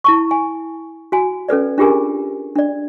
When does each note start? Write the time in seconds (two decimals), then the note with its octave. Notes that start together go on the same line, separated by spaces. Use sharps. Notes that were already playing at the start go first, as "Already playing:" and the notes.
0.04 E4 A5 C#6
0.31 G#5
1.12 F#4 G#5
1.48 C#4 A4 B4 D5
1.78 D4 F4 G4 G#4 A#4 G#5
2.55 D4 D5